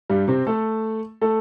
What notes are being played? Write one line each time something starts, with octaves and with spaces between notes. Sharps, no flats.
G2 G3
C3 C4
A3 A4
A3 A4